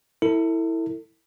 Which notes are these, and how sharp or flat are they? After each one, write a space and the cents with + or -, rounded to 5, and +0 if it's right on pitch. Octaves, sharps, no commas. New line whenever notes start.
E4 -10 A4 +35